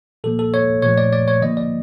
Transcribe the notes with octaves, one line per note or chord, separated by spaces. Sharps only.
A#2 F3 A#3 A4
A4
C#5
A#2 F3 A3 C#5
D5
D5
C#5
D3 F3 A#3 D#5
D5